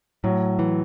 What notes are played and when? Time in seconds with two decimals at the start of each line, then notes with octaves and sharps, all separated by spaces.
0.24 A2 F#3
0.59 E3